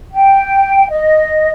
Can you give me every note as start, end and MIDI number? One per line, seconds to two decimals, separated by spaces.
0.13 0.86 79
0.90 1.53 75